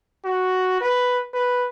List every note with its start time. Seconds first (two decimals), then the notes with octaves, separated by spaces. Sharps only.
0.25 F#4
0.81 B4
1.34 B4